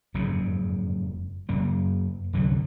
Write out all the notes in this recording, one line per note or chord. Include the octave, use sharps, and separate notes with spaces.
F#1 F2 G#2 C#3
F#2 C#3 A#3
C2 F#2 D3 F#3